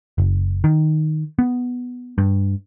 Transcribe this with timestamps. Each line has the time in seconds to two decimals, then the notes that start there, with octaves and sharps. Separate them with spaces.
0.18 F#1
0.64 D#3
1.39 B3
2.18 G2